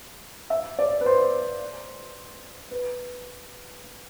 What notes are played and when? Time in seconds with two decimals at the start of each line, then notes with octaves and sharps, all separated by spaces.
0.50 E5
0.79 D5
1.01 B4
1.06 C5
2.71 B4